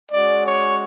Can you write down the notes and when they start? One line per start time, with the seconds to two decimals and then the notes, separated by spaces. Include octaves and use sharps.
0.11 G#3 C#4 F#4 D5
0.45 C#5